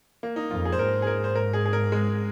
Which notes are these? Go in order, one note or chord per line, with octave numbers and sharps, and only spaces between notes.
A#3
D#4
F2 F4
G#4
C5
G#2 A#4
G#4
A#4
C5
A#4
G#4
G#4
A#4
G#3